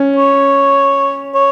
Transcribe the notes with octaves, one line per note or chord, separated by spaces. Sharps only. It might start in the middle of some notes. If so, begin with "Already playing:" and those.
Already playing: C#4
C#5
C#5